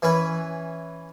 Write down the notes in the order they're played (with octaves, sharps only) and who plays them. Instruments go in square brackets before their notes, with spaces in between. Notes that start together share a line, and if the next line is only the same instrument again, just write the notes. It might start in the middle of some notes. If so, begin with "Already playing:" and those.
[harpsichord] E3 C#4 B4